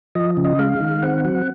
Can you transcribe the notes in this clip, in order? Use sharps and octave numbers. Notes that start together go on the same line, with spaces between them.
F3 D#5
C#3
D#5
G#3 F5
D#3
C4 F#5
F#3 F#5